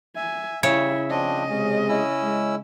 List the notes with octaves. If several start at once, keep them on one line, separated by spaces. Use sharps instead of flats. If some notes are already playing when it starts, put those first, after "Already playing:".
E5 G#5
C#3 G3 E4 C#5 E5
F3 C4 D4 D#5
C3 G#3 C#4
C#4 E4 E6
G#3